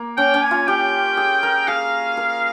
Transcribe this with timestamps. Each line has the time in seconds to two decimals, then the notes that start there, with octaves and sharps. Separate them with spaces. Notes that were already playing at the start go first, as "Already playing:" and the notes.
Already playing: A#3
0.17 C#4 G5
0.34 C#4
0.43 G#5
0.51 F4
0.67 G4 G5
1.17 G#4
1.43 A#4
1.67 G#4 F5
2.17 A#4